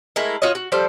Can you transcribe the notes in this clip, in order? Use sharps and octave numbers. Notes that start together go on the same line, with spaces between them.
G#3 A3 E4 A#4
F4 F#4 C#5 D#5
F#4
F3 G3 A4 C5